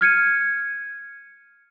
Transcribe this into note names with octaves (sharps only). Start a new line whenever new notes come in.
F6 G#6 C#7 D#7